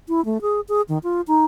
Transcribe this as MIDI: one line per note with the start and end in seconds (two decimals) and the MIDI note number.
0.08 0.24 64
0.25 0.41 57
0.41 0.60 68
0.68 0.81 68
0.88 0.98 51
1.03 1.21 65
1.27 1.45 63